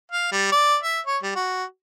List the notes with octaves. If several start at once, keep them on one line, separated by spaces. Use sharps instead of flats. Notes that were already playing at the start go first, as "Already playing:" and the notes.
F5
G3
D5
E5
C#5
G3
F#4